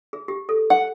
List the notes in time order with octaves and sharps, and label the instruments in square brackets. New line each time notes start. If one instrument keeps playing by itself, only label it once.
[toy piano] G#4
G4
A4
[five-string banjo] F#5